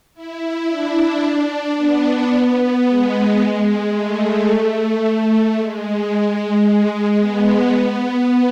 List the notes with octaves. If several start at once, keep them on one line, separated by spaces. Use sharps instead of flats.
E4
D4
D4
B3
G#3
G#3
A3
G#3
B3
B3